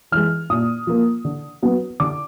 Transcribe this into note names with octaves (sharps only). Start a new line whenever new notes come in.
E3 G#3 F6
A#2 D#6
F3 A#3
D3
F#3 B3
D3 D6